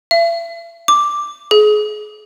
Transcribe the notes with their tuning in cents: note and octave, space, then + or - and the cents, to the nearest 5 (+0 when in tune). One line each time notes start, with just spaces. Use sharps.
E5 +40
D6 +0
G#4 +30